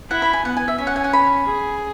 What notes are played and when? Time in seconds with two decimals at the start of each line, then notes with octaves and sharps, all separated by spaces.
0.10 E4 F#5
0.22 B5
0.33 G#5
0.44 B3 F#5
0.57 G#5
0.68 E5
0.78 C#4 E5
0.87 F#5
0.96 G#5
1.04 F#5
1.13 B5
1.47 G#4